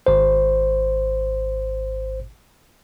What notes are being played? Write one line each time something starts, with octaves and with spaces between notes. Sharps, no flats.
G#1 C5